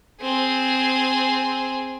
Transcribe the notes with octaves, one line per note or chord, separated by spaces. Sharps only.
C4 G#4